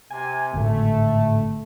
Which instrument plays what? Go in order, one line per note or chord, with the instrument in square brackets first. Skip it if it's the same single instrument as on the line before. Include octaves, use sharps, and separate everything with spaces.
[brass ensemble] C3 G#5
[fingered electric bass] G#1 A2 D3 [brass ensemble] A3